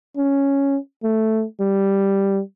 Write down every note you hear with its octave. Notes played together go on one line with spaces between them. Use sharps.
C#4
A3
G3